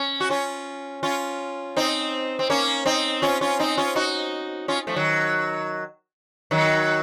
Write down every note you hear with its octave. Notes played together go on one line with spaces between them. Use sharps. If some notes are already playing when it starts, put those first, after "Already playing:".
Already playing: C#4
F#4
C#4 F4
C#4 F4
C4 D#4
C4
A#3 C#4
C4 D#4
C#4 F4
C#4 F4
C4 D#4
C#4 F4
D#4 F#4
C#4 F4
F3 A3
D#3 F#3
D#3 F#3